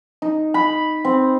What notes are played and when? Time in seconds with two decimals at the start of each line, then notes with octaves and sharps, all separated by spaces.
0.22 D#4
0.54 B5
1.05 C4